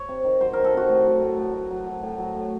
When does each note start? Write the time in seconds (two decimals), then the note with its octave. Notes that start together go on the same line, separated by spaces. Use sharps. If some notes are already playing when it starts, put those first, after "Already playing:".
Already playing: C#5
0.09 C3
0.24 D#3
0.41 F#3 C5
0.53 D#3 A#4
0.64 A4
0.74 C3 F#4
0.89 A2
1.06 F#3
1.22 A2
1.37 A2
1.53 F#3
1.71 F#3
1.86 F#3
2.03 A2
2.18 F#3
2.34 A2